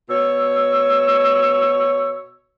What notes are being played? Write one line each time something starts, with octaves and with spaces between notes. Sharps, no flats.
B2 C#5 E6